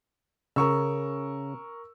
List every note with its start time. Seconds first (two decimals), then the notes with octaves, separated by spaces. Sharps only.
0.56 C#3 A#4 C#6 E6